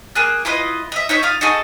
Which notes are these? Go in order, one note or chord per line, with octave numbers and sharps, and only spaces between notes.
A#3 G#4 F#6
E4 F4 B4 D#5
D#5 E5
D#4 C#5 E5
F4 F5 D#6
D#4 F#4 G#4 A4